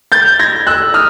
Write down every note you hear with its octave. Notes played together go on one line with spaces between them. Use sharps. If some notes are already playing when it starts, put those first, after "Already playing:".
G6 A6
G#6 A#6
E6 F#6
D#6 F6